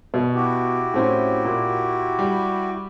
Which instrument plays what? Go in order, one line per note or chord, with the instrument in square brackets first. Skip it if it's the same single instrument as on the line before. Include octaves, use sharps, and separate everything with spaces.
[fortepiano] B2
[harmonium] E4 F#4 G4
[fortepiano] A2 C4 C#4
A#2
G3